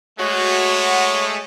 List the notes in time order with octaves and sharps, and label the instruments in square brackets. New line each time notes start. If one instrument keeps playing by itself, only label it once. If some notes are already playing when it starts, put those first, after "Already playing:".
[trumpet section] G#3 A3 [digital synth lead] F#4 [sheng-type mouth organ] C#5